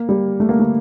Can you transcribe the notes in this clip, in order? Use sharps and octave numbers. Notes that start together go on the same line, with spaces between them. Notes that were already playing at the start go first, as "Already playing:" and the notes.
Already playing: A#3
G3
A3
A#3
A3